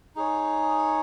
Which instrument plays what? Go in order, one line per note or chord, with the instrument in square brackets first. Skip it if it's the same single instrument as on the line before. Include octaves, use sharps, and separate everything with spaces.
[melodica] D#4 G#4 C#5